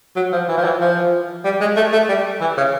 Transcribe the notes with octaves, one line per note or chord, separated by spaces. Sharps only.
F#3
F3
E3
F3
E3
F3
G3
G#3
A3
A3
G3
E3
C#3